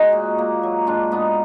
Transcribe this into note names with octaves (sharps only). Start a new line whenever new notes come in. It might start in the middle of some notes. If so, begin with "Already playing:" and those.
Already playing: G#3 D#4 F#4 D#5
A#2
A#3
F#3
G#2 D4 F4
G#2 B3 D#4